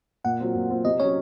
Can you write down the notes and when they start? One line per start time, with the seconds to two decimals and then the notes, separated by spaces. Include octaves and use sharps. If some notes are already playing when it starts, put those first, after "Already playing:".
0.24 A#2 F#5
0.40 F#3 C4 F4
0.55 A#2
0.70 F#3 C4 F4
0.85 C3 D#5
1.00 F#3 C#4 C#5